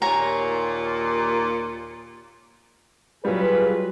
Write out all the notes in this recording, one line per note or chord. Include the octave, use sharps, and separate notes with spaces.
D#2 A#2 C#5 G#5 A#5
F#3 G3 F4 G#4 B4